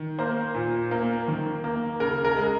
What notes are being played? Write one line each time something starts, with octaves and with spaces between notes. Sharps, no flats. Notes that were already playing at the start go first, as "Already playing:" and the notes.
Already playing: D#3
A#3 C5
A#2
A#3
D#3
A#3
C#3 A#4
A#4
G#3